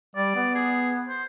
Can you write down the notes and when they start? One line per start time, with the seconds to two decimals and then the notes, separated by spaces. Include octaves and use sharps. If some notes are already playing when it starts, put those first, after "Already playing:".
0.16 G3 D5
0.35 B3
0.55 G#4
1.09 C5